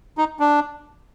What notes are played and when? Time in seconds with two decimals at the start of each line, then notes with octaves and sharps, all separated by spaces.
0.18 D#4
0.40 D4